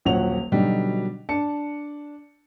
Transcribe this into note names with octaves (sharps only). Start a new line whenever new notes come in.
D#1 A#1 F#3 C#5 F#5 F7
B2 D3 F#3 G3 D4 D#4
D4 A5 C#7